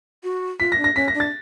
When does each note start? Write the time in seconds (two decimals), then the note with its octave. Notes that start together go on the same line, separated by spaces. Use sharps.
0.23 F#4
0.60 F4 B6
0.72 A#6
0.78 D4
0.84 A#6
0.96 C#4 B6
1.08 A#6
1.14 D4
1.20 A6